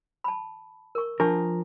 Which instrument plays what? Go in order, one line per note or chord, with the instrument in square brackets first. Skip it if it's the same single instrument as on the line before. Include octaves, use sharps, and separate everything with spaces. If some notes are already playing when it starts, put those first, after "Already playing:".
[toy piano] A5 B5
A#4 C#6
[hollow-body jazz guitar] F3 A#4 [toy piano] D4 A5 C#6